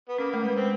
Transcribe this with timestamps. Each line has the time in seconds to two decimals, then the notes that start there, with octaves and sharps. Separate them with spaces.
0.09 B3
0.18 A#3 C#4
0.31 A3 A#3
0.43 G#3 B3
0.56 C4